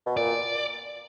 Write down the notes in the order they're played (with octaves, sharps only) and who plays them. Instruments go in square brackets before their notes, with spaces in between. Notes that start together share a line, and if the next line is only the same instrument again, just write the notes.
[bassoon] B2
[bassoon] A#2 [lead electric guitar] D5